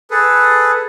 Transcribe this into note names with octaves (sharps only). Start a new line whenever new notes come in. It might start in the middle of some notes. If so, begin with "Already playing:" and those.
G#4 A4 B4